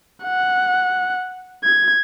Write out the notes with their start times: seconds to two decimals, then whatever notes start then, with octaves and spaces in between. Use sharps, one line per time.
0.25 F#5
1.64 G#6